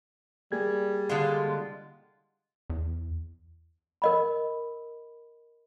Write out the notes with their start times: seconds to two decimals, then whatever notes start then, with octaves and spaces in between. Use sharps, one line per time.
0.52 G3 A#3 G#4 G#6
1.09 D3 G#3 F4
2.70 E2
4.02 A#4 D#5 B5